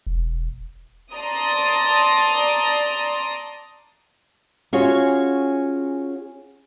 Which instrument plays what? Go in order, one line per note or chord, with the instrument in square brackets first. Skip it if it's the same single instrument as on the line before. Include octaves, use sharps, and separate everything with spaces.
[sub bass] E1
[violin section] D5 A5 A#5 C6 D#6
[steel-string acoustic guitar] C#4 F4 F#4 G#4 C#5